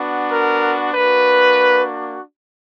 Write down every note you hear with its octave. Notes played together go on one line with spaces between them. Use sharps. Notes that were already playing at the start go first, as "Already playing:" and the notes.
Already playing: B3 D4 F#4
A#4
A#3 D4 F#4 B4